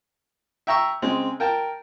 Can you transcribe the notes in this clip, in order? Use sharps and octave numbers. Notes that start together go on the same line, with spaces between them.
E5 G5 A#5 C#6 E6
C#3 G#3 C4
A#4 G5 A5